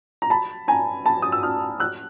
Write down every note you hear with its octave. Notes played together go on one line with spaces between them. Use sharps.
A#5
A5 B5
G#5 A#5
A5 B5
D#6
E6
D#6 F6
E6 F#6